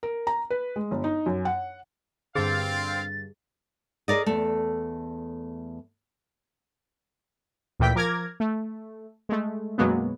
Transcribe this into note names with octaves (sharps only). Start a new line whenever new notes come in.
A#4
A#5
B4
G#3
G1
D#4
F#2
F#5
G2 D3 C4 G#4 F5 A6
G#4 A#4 D5 D#5
E2 A3
D2 A#2 E3 G5 B6
F3 A#4 D6 F6 G#6 A#6
A3
G#3 A3
F#2 B2 F#3 G#3 A#3 B3